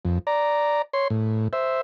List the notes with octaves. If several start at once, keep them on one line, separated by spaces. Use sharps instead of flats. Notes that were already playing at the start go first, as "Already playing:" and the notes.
F2
D5 A#5
C#5 C6
A2
C5 E5